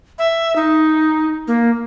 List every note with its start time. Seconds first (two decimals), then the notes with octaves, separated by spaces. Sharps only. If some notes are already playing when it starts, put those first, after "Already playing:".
0.19 E5
0.56 D#4
1.47 A#3